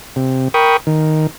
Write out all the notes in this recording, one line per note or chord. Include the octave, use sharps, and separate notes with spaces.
C3
A#4 G5 B5 C#6 D#6
D#3